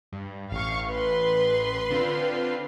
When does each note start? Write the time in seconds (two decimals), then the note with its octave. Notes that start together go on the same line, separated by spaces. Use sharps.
0.12 G2
0.51 A1 F5 C#6
0.89 B4 C6
1.90 D3 C4 F4